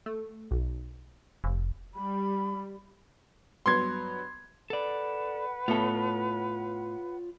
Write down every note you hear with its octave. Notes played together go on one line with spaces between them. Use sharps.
A3
B1
F1
G3 B5
G2 F#3 B3 C6 G#6
A4 B4 D5 F#5
A2 B3 F4 A4 C#5